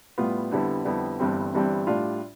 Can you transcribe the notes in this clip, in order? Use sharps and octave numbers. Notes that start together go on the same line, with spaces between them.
A2 G3 B3 F4
F2 D3 G3 B3 E4
F2 D3 G3 B3 E4
G1 G2 E3 G3 C4
G1 G2 E3 G3 C4
A2 G3 D4 F4